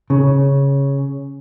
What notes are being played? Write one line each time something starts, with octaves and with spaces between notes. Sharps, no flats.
C#3